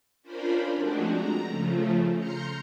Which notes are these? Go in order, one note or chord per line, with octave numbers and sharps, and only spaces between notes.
C#4 D4 F4 A#4 C5 B5
F3 G#3 A3 C4 D4 F#4
A#5
C#3 F3 A3
A#5 C6 F6 G6 C#7